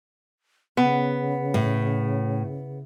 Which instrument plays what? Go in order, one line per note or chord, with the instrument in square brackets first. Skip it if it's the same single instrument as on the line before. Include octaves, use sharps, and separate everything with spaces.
[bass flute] C#3 [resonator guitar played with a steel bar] B3
[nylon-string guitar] A2